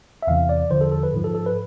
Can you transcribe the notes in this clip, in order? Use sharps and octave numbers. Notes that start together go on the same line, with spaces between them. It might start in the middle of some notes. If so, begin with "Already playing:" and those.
E5
E2 C3 E3 F5
D5
E2 D3 F3 C5
A4
A4
B4
G#2 F3
A4
A4
B4